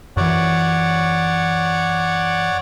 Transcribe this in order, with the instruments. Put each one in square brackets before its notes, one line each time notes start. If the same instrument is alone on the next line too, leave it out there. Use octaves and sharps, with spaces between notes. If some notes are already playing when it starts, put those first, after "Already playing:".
[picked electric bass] F#2 E3 [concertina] C#5 D5 F#5